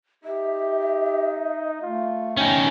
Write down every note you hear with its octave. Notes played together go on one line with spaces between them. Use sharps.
D#4 G4 E5
A3 F4
C#4 D#4 G5 G#5